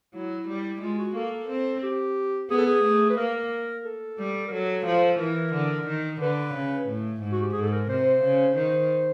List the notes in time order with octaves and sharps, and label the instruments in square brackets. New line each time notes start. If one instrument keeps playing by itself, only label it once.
[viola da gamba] F#3 [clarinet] E4
[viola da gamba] G3
[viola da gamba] G#3 [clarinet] F4
[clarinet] F#4
[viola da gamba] A#3 [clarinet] A4
[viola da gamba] C4
[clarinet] G4
[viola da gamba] B3 [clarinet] G#4
[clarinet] A4
G#4
[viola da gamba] A3
[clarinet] B4
[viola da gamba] A#3 [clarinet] A#4
[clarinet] A4
[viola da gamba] G3
[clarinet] A#4
[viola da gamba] F#3 [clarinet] A4
[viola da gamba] F3
[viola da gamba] E3 [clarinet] A#4
[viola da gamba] D3
D#3
[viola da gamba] D3 [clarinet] B4
[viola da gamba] C#3
A2
G#2
[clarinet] F#4
G4
[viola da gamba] G#2 [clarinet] G#4
[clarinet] A4
A#4
[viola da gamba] C3 [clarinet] C5
[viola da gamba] C#3
[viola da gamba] D#3 [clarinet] C5